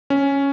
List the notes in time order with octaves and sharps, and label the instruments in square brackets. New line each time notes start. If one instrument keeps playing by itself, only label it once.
[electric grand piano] C#4